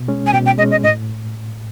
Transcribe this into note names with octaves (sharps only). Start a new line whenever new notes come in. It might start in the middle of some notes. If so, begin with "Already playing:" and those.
Already playing: B2
G#3 C#4
G#5
B2 G5
G5
G#3 C#4 D#5
D#5
A2 D#5